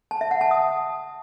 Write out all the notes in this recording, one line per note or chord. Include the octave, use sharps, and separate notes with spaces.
A5
E5
F#5
A5
D#6